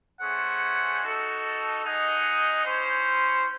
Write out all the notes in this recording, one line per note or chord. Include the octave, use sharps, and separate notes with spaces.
A3 C#4 G#4 C5 F#5
D#4 F#4 A4
D#4 G#4 D#5 F#5
C#4 E4 C5